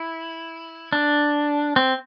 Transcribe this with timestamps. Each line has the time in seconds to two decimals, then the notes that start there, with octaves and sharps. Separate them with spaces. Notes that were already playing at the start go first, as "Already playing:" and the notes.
Already playing: E4
0.93 D4
1.76 C4